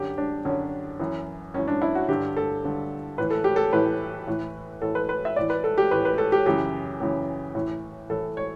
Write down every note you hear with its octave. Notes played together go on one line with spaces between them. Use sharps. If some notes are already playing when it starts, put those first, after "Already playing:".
Already playing: F#2 D3 G4
D4
F#2 D3 C#4
F#2 E3
F#2 E3 C#4
D4
E4
F#4
G2 D3 G4
A4
G2 D3
A2 E3 B4
A4
G4
A4
A2 E3 B4
A2 E3
A2 E3 A4
B4
B4
E5
A2 E3 D5
B4
A4
G4
A2 E3 B4
B4
A4
G4
F#2 C#3 E3 G4
F#2 C#3 E3
A2 E3
A2 E3 A4
C#5